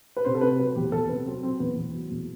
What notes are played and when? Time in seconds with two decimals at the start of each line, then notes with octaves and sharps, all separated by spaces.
0.17 B4
0.25 C3 C5
0.35 A4
0.41 C3 B4
0.59 F#3 B4
0.76 E2 G4
0.92 E2 A4
1.09 C3 B4
1.26 F#3 C4
1.43 F#3 C4
1.60 E2 B3
1.77 E2
1.94 F#3
2.11 E2